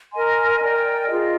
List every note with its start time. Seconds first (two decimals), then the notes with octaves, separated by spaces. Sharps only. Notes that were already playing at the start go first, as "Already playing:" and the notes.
0.12 A#4 D#5 G#5 C6
0.60 A#4 D5 G5
1.08 F4 G#4 D#5